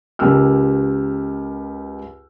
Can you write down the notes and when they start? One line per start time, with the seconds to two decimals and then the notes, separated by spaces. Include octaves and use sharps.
0.19 C#2 G4 A#4 E6 F6